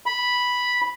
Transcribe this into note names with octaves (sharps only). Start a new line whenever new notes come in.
B5